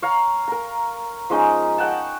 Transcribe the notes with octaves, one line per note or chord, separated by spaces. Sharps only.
C#5 F5 A#5
A#4 A#5
F3 G#3 C#4 D#4
D#5 F#5 G5 A5